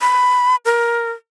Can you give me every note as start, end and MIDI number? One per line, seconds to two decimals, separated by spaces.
0.01 0.56 83
0.65 1.12 70